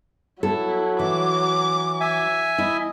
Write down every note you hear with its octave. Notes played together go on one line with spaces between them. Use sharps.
F#3 E4 A4
E3 D6
E5 G#5
E4 D#5